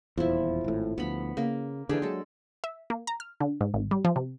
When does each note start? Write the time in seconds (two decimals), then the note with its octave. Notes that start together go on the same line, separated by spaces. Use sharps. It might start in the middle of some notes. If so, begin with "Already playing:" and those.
0.18 D#1 E2 F3 E4
0.64 G#1 A2
0.98 D2 F3 B3 B5
1.37 C#3 A#3
1.89 D3 E3 D4 G4 G#4
2.02 F#3 G#3 A4
2.64 E5
2.90 A#3
3.07 A#5
3.20 F6
3.40 D3
3.61 G#2
3.74 G#1
3.91 G3
4.05 F3
4.16 C3